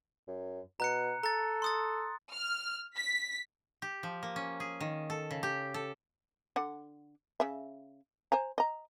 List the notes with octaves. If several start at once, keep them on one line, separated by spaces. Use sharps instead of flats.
F#2
B2 A#5 F#6 C#7
A4 A#5 A6
C6 D#6 A6
F6
B6
G4
F3
A#3
C#4
G#4
D#3
A4
C#3
G4
A4
D3 F#5
C#3 E5
C5 G#5 A#5
D#5 A#5